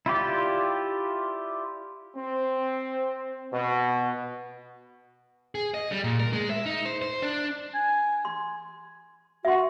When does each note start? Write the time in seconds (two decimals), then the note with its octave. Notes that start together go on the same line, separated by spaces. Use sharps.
0.06 E4 F4 G4 D5
2.16 C4
3.52 B2
5.55 G#4
5.74 D#5
5.92 G3
6.04 A#2
6.20 A#4
6.33 G#3
6.50 E5
6.66 D#4
6.85 C5
7.02 C5
7.22 D4
7.74 G#5
8.25 C6
9.45 F#4 E5 C6